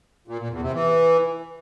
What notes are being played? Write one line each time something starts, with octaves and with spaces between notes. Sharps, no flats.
A#2
A#2
E2
C3
E3